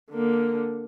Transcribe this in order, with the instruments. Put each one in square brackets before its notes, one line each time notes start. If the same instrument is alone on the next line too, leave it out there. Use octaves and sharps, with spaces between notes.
[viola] D3 A#3